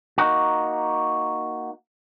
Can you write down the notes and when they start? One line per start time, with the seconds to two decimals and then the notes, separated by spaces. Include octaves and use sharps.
0.18 A#3 D#4 F#4